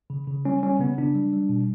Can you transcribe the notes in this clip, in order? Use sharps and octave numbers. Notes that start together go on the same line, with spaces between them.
C#3
C#3
G3 C#4
G3 C#4
C#3 B3
C#3 D4
G3
G3
B2